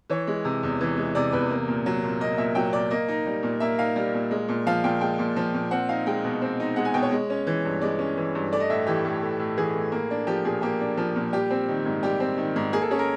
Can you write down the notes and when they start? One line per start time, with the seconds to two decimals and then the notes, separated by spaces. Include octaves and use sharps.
0.10 E3 C#5
0.27 G#3
0.45 C3
0.63 E2
0.81 E3
0.97 G#3
1.15 C3 D5
1.32 E2 B4
1.50 A#3
1.68 A#2
1.86 F#3
2.04 A#2
2.21 A#3 D#5
2.38 A#2 E5
2.55 F#3 G5
2.73 A#2 D5
2.91 A#3 D#5
3.08 D#4
3.26 G3
3.43 A#2
3.60 A#3 E5
3.79 D#4 F5
3.96 G3
4.14 A#2
4.31 G#3
4.49 A#2
4.67 F3 F5
4.84 A#2 G5
5.01 G#3 G5
5.19 A#2
5.36 F3
5.54 A#2
5.71 C4 F#5
5.89 D#4 F5
6.06 G#3 G5
6.24 B2
6.42 C4
6.60 D#4
6.76 G#3 F#5
6.85 G#5
6.94 B2 G5
7.02 C#5
7.12 G#3
7.30 C#4
7.47 E3
7.65 G2
7.81 G#3 D5
7.99 C#4
8.17 E3
8.35 G2
8.52 A3 D5
8.60 D#5
8.70 A2 E5
8.87 E3 G4
9.05 A2
9.23 A3
9.39 A2
9.57 E3 G#4
9.75 A2
9.92 A#3
10.11 D4
10.27 F3 G4
10.45 A#2 G#4
10.62 A#3 G4
10.81 D4
10.97 F3
11.16 A#2
11.33 G3 G4
11.51 C4
11.68 D#3
11.86 G#2
12.03 G3 G4
12.20 C4
12.38 D#3
12.56 G#2
12.73 A#3 G#4
12.82 A4
12.91 C#4 G#4
12.99 A#4